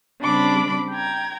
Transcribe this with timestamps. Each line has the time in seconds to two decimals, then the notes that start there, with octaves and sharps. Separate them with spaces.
0.22 C#3 G3 C4 D4 B5 D6
0.92 G5 A#5 G#6